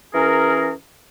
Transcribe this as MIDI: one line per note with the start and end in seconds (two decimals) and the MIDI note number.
0.14 0.72 52
0.14 0.72 61
0.14 0.72 68
0.14 0.72 70